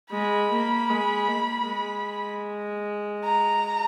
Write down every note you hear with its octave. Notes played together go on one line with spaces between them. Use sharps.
G#3 B5
A#3
G#3
A#3
G#3
A#5